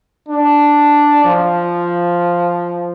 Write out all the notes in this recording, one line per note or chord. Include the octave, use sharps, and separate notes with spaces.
D4
F3